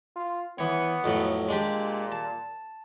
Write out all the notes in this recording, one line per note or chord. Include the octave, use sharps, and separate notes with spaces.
F4
E3 B3 C#5
F2 A2 F#3
A#2 G#3 D4 G4
A5